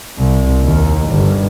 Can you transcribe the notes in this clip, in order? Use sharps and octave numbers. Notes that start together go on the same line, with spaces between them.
C2
D#2
G1